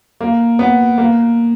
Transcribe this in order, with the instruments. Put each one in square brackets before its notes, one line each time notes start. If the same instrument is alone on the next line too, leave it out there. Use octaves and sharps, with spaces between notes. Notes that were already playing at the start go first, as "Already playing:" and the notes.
[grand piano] A#3
B3
A#3